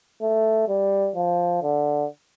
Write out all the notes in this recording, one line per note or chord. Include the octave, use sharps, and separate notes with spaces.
A3
G3
F3
D3